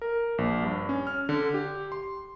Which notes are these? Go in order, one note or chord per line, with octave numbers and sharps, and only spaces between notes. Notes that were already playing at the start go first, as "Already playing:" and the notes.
A#4
A#1
G2
C#4
F6
D3
G4
C6